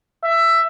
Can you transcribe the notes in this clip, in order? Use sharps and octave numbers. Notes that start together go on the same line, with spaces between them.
E5